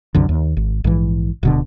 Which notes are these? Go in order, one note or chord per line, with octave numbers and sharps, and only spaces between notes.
C2 F#2 D3
D#2
G#1
A#1 G#2 E3
D1 B2 D3